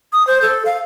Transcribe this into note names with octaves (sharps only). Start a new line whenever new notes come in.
D#6
C5
A4
F5